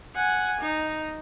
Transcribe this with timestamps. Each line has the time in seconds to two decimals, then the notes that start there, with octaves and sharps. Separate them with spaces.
0.15 F#5 G#5
0.61 D#4